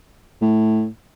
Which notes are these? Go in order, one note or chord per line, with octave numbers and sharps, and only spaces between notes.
A2